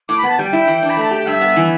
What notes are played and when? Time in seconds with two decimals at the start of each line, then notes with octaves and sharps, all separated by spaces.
0.09 A2 D6
0.18 B5
0.23 B3 A5
0.39 G3 G5
0.53 E4
0.68 E3
0.83 D4
0.90 B5
0.97 A3 A5
1.11 G4 G5
1.26 G2 E5
1.41 B3
1.56 E3